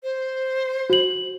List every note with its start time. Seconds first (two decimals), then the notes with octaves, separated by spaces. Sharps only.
0.03 C5
0.90 F#4 F#7